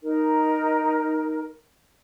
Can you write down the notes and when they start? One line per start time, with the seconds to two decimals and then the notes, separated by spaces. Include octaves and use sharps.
0.03 D#4 A#4